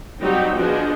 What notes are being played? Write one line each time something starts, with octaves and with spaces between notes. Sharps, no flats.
F#3 G3 C4 D#4 F#4 G4
F3 B3 D4 G#4 D#5